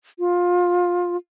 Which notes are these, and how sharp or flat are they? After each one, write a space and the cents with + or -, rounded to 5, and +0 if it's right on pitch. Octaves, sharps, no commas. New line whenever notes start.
F4 +20